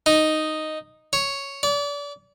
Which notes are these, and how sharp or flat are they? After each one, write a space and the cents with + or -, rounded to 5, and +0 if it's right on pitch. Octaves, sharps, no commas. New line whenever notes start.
D#4 -5
C#5 +0
D5 -35